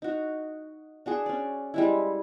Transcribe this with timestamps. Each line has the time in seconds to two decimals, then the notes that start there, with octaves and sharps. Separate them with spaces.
0.02 D#4 F#4
1.06 D4 F#4 G#4
1.26 C#4 D5
1.74 G3 G#3 E4